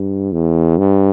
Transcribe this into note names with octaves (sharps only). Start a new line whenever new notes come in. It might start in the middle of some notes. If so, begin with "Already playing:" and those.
Already playing: G2
E2
G2